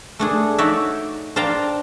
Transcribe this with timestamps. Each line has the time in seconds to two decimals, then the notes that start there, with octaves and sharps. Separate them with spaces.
0.19 A3 D4 G#4
0.58 D#4 F#4 C#5 D5 E5
1.36 D4 C5 F5 G5 A5 A#5